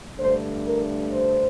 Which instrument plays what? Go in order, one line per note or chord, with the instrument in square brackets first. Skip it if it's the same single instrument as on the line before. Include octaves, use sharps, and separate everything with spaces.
[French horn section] G2 D3 A3 C5
A#4
C5